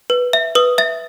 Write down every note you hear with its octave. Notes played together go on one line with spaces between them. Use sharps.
B4
E5
B4 D#6
E5 A6